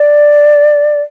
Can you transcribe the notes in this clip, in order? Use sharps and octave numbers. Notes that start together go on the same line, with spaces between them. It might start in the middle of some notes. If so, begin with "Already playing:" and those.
Already playing: D5